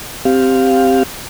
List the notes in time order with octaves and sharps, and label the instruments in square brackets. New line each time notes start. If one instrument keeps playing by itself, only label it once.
[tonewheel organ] C4 G4 F5